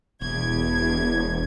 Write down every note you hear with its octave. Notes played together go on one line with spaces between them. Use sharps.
E1 E2 G#6